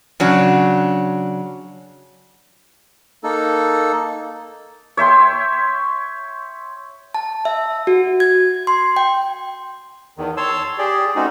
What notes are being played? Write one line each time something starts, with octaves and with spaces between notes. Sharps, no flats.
C#3 F#3 D4
A#3 D#4 A4
C#5 E5 G5 C6
A5
E5
F#4
G#6
C6
G5
E2 D#3
C#5 A5 C6 E6
G4 G#4 D5
A3 C4 C#4 D#4 F#4